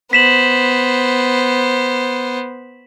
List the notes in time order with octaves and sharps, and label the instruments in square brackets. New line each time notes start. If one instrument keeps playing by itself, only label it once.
[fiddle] B3 C5 [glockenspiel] B6 E7 F#7